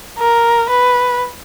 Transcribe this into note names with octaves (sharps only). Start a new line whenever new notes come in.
A#4
B4